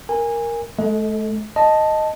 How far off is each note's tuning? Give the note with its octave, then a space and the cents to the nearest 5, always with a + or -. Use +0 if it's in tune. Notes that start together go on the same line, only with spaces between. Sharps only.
A#4 +0 G#5 -20
A3 -40 A4 +0 D#5 +30
D#5 +0 A5 +0